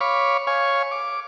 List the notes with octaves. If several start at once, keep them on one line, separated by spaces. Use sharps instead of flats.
C#5 F5 B5 C#6 D6
C#5 F5 G#5 C#6
D6